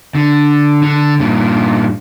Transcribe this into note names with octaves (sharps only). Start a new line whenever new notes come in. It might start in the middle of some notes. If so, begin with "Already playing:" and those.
D3
D3
G2 A#2